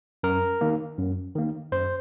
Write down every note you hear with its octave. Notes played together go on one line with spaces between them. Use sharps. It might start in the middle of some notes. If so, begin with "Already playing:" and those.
F#2 A#4
D#3 A#3
F#2
D#3 A#3
F#2 C5